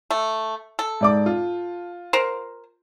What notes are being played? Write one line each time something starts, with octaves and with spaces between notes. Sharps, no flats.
A3
A4
G#2 D5 D6
F4
A#4 C5